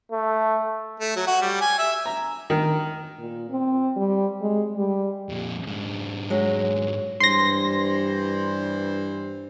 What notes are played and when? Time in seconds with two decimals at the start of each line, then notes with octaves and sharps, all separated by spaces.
0.12 A3
1.00 A3
1.16 F#3
1.27 F#4
1.41 G3
1.61 G#5
1.79 E5
2.06 A#5
2.50 D#3
3.19 A#2
3.50 C4
3.96 G3
4.41 G#3
4.76 G3
5.29 F2 A#2
5.67 G#2 D4
6.30 F#3 G#3
7.20 G2 E3 G3 C5 C6 A#6